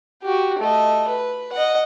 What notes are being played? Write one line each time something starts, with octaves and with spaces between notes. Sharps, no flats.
F#4 G4
A3 D#5
B4
D#5 F#5